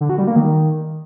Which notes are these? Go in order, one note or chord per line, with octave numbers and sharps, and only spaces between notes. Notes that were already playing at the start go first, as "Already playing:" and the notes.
D3
F#4
G3
A#3
D#3